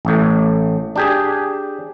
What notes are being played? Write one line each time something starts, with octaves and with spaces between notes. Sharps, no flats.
A1 A2
D4 G4 G#4